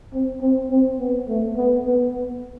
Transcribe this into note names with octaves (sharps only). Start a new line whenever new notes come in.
C4
C4
C4
B3
A3
B3
B3